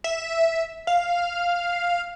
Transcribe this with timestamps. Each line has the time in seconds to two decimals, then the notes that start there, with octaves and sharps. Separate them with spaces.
0.04 E5
0.87 F5